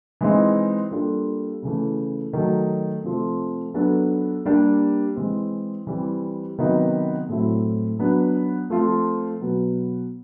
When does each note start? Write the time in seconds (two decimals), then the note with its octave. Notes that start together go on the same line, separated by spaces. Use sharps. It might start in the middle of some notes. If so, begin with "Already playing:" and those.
0.21 E3 G#3 C4 D#4
0.91 G3 A#3 D4 F4 A4
1.62 C#3 E3 A3
2.33 D#3 F#3 A3
3.03 C3 F3 A3 C4 F4
3.74 F#3 B3 D4 F#4 A4
4.45 G3 A#3 D4 G4
5.16 E3 G#3 C4
5.87 E3 G3 C4
6.58 C3 D#3 F#3 B3 D#4
7.29 A2 F#3 A3 C4 E4
7.99 F#3 B3 D4
8.70 F3 A3 C4 F4
9.41 B2 F#3 B3